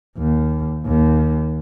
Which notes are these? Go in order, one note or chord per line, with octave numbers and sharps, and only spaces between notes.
D#2
D#2